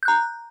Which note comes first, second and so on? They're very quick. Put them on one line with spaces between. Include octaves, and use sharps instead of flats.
G6 F#6 A#5